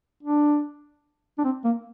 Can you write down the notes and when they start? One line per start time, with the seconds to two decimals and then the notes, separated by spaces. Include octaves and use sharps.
0.23 D4
1.38 D4
1.44 C4
1.64 A#3